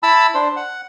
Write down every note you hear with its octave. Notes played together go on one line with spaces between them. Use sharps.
E4 A5 B5 E6
D4 C5
F#5